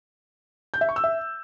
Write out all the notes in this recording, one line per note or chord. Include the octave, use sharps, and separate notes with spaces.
G6
E5
C#6
E6
E5